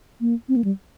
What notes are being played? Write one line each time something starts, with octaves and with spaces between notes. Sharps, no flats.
A#3
C4
A#3
G3